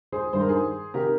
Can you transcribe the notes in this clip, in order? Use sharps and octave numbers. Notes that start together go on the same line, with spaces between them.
G#4 C5
G2 D#3 G3 C5
A#4
G#4 C5
C3 D#3 G4 A#4